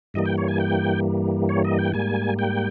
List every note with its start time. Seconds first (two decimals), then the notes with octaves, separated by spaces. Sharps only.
0.14 G2 E3 G3 A#3 D#5
0.26 G5
0.38 C#5
0.48 G#5
0.60 G5
1.49 C#5
1.64 D#5
1.79 G5
1.94 G#2 G3 A#3 G#5
2.39 G5